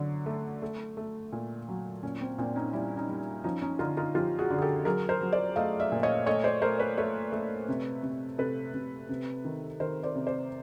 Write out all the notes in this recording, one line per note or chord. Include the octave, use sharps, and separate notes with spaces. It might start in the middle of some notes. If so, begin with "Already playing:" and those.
Already playing: D3 F#3
A3
A3
A3
A#2
F#3
A#2 C#4
C4
A#2 C4 D4
C#4 D#4
G3 D4 E4
C#4 D#4
G3
F3 C#4 D#4
C#4 D#4
D3 D#4 F4
D#4 F4
F3 F4 G4
F#4 G#4
D3
G#4
G4 A4
F#3 G#4 A#4
A#4 C5
F#3
C5 D5
A3 D#5 F5
D5 E5
A#2
C#5 D#5
A3 C#5 D#5
C5 D5
A3 A#4 C5
B4 C#5
A3 B4 C#5
A3
C3
C3
C3 A4 B4
C3
C3
D#3
D#3 A#4 C5
C5 D5
C3
C5 D5